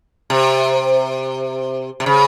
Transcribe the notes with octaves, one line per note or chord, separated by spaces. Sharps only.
C3
C3
C#3